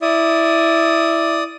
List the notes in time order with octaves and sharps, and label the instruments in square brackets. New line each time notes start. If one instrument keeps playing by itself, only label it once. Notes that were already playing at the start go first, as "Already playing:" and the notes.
[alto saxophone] E4 [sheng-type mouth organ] D5 D#6